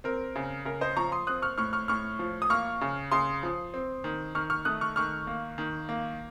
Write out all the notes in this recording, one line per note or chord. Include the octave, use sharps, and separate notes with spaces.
C4 A#4
C#3
C#3 A#4
C5 D#5
F3 A#5 C#6
C6 D#6
C4 D#6 F#6
C#6 F6
A2 C#6 F6
C#6 F6
A2 C#6 F6
F3
D#6
A#3 C#6 F6
C#3
C#3 C6 D#6
F3
C4
D#3
D#3 C#6 F6
C#6 F6
A3 D#6 F#6
C#6 F6
D#3 C#6 F6
A#3
D#3
A#3